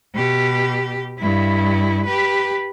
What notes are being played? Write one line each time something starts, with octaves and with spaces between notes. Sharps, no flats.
B2 G4
G2 E4
G4 B4